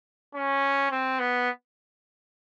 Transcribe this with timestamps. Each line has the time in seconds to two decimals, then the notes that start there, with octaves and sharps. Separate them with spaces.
0.35 C#4
0.91 C4
1.19 B3